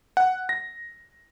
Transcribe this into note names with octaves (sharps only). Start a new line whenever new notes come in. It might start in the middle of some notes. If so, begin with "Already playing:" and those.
F#5
A#6